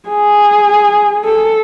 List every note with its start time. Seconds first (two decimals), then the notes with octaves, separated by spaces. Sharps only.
0.09 G#4
1.25 A4